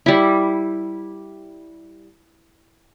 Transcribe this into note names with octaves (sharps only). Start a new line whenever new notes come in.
G3 E4